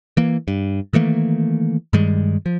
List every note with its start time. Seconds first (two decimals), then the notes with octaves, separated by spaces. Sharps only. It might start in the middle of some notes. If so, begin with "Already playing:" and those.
0.17 E3 A#3
0.48 G2
0.93 D#3 E3 A3 A#3
1.93 G2 D#3 G3 G#3
2.46 F3